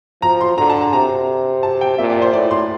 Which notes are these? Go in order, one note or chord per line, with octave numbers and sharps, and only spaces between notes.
F3 A#5
C6
D3 A#5
A5
A#5
C3 A#5
A5
G5
A#2 E5
D5
C5
A2 D5
C6